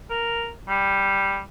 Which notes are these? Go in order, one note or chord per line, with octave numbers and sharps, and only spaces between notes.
A#4
G3